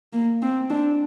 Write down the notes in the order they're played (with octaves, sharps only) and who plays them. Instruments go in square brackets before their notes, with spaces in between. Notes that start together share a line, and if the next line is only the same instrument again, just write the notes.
[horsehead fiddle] A#3
C4
D4